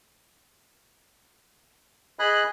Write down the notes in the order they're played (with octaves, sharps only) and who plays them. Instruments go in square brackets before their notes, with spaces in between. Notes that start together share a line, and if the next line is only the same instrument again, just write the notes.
[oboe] G#4 [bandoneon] D#5 B5 F#6